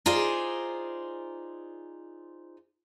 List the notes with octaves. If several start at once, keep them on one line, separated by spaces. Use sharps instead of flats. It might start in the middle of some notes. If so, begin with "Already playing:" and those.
D#4 F4 G#4 C5 D5